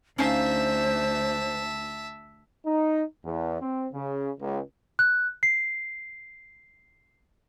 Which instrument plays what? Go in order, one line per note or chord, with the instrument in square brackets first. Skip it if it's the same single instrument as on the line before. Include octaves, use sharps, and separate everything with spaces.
[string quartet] D2 [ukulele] C#4 D#4 F5 [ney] C5 [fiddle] E5 A5
[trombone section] D#4
E2
C4
C#3
C#2
[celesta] F#6
C7